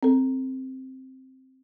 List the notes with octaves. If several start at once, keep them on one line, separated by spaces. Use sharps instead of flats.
C4 A4